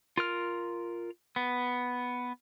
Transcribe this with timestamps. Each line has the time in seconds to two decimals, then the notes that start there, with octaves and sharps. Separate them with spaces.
0.17 F4 A#4 F6
1.36 B3